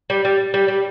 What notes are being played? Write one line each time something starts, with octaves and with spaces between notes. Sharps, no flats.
G3
G3
G3
G3